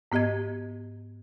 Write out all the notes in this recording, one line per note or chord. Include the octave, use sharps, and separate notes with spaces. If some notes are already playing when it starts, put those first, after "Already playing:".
G#2 B3 G4 D#5 G#6